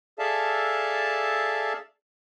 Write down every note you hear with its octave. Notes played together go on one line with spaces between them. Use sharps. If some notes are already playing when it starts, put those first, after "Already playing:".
G#4 A4 D5 E5 F5 A5